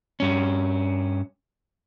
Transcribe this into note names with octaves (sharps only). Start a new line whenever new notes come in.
G2 C#4